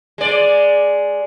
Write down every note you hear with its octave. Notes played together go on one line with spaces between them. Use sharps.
G#3 D5